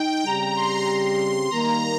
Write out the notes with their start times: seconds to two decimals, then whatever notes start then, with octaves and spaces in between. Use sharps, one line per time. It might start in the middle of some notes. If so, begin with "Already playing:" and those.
Already playing: D#4 G5
0.25 C#3 G3 C4 G4 A#5
0.56 C6
1.51 D#3 G3 A#3 D#4 A#5